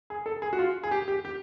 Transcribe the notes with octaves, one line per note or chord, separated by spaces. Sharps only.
G#4
A4
G#4
F#4
F4
G#4
G4
G4
G4